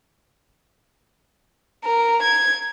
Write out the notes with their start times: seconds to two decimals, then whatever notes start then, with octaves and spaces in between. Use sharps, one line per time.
1.85 A#4
2.23 G#6